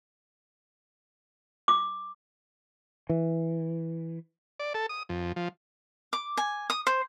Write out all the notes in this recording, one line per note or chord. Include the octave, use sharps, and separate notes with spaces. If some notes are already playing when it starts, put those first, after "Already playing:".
D6
E3
D5
A4
D#6
F2
F3
D6
G#5
D#6
C5